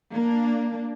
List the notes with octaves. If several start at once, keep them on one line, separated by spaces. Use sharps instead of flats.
A#3 D4